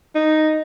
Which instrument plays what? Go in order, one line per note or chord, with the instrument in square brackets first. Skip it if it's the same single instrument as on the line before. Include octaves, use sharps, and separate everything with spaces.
[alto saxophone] D#4